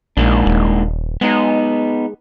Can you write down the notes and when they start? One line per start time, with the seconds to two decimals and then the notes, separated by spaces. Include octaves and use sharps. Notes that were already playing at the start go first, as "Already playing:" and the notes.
0.17 A#1 G#2 A#3 D4
0.46 D#1
1.21 G#3 B3 D#4